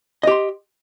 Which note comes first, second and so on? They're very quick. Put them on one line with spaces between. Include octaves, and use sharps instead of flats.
D#5 G4 C6